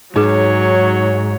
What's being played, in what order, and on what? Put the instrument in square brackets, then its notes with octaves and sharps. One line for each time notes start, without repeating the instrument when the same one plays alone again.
[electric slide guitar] G#2 [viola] F#3 C#5 [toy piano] D#4 G#4 B4